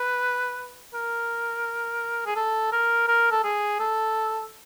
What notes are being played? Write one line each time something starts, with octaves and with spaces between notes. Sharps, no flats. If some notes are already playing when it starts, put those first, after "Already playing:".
Already playing: B4
A#4
G#4
A4
A#4
A#4
A4
G#4
A4